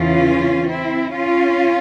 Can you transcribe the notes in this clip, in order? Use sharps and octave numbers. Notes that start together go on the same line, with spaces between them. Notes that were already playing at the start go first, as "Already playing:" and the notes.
Already playing: E2 C#3 E3 C#4 F4
C4 E4
C#4 F4